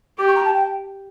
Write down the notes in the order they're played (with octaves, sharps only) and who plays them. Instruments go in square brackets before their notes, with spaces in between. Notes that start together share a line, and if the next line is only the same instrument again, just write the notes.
[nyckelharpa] G4 [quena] D6
[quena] C#6
A#5
A5
G5